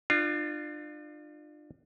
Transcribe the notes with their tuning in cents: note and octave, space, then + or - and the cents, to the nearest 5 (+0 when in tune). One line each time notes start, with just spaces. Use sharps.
D4 +35 F4 +0